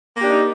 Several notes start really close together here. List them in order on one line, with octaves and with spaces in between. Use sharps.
A#3 G4 D4 D#4